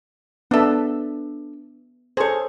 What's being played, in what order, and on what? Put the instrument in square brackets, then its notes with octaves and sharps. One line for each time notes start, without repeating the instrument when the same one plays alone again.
[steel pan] B3 E5 [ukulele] D4 A4
[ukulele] G#4 C#5 [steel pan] A4 C5